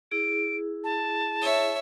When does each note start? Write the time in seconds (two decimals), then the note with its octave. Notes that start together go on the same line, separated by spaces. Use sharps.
0.12 E4 G#4 D7
0.84 A5
1.42 C#5 E5